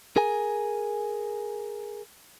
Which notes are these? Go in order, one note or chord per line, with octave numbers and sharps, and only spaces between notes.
G#4 A#4 G#5